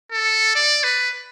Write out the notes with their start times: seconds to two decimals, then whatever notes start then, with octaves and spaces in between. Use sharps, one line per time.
0.12 A4
0.56 D5
0.84 B4